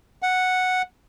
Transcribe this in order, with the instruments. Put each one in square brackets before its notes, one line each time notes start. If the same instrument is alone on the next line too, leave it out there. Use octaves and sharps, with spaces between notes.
[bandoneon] F#5